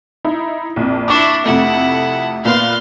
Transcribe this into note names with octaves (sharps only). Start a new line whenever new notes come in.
D#4 E4
A#1 F2
D4 E4 C#6 D6
F2 C3 A3 E4 F#5
A#2 B3 F4 F5 C6